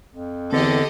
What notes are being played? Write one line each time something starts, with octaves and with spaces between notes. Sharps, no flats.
F2
E2 D3 C4 G4 A4 D#5